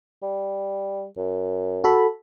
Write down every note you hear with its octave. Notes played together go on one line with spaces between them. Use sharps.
G3
F#2
F#4 A4 B5